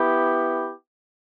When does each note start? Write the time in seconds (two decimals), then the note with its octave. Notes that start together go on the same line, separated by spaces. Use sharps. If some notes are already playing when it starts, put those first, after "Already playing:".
Already playing: B3 E4 G4